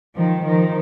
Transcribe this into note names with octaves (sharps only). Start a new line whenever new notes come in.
D#3 F3
D#3 F3